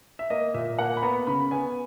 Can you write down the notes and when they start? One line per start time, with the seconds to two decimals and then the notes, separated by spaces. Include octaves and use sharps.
0.19 E5
0.30 A#3 D#5
0.54 A#2 E5
0.79 A#3 F#5
0.97 B5
1.03 B3 A#5
1.27 C#3 B5
1.51 B3 G#5